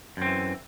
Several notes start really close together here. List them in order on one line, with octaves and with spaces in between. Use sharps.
F#2 C4 E3